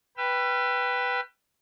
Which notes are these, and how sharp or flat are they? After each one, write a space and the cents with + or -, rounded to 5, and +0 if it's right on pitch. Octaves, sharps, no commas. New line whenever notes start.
B4 +0 G5 +5 E6 +40